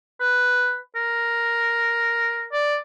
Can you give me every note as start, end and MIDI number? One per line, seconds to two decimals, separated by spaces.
0.21 0.77 71
0.96 2.47 70
2.52 2.77 74